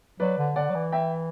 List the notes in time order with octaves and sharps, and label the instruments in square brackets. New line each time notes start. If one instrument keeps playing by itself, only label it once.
[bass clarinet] F#3 [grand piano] B4 D5
[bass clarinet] D3
[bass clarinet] D3 [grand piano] D5 F#5
[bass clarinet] F#3
E3
[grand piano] E5 G5